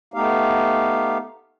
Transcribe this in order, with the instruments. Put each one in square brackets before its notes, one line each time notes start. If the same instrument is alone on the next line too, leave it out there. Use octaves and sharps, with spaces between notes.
[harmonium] A3 B3 D#4 G4 F5